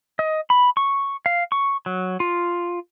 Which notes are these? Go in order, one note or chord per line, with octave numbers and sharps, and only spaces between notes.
D#5
B5
C#6
F5
C#6
F#3
F4